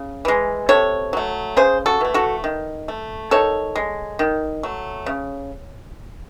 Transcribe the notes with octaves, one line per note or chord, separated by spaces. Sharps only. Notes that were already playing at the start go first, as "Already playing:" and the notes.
Already playing: C#3
E3 G#3
C3 A4 C#5
F#3 A3
C#3 G#4 C5
F#4 A4
E3 A3
F#4 A4
D#3
A3
D#3 A4 C#5
G#3
D#3
F#3 A3
C#3